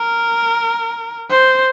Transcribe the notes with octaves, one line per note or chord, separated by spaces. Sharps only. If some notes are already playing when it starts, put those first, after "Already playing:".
Already playing: A#4
C5